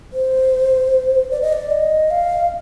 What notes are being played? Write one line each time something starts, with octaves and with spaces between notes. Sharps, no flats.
C5
D5
D#5
D5
D#5
F5